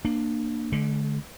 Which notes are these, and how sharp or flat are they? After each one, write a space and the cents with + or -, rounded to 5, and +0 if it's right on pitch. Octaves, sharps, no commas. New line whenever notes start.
A#3 +0 D4 +25
D3 +0 A3 -45